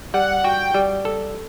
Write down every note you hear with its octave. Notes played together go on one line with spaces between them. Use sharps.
G3 F#5
F#4 G5
G3
A4